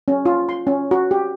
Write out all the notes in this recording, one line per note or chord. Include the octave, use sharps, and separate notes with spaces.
C#4
F4
C6
C#4
F#4
G4